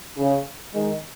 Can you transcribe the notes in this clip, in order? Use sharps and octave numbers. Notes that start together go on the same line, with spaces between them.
C#3
D#3 G#3